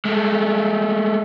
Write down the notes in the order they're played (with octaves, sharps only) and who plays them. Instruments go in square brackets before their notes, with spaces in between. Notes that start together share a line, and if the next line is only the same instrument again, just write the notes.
[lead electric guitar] G#3 A3